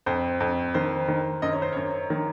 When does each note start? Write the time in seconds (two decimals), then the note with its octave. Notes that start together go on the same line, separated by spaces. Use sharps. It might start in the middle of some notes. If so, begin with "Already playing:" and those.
0.06 F2 C5
0.40 F2
0.74 D#3 C5
1.08 D#3
1.42 F#2 D#5
1.53 C#5
1.62 C5
1.73 F#2 C#5
2.10 D#3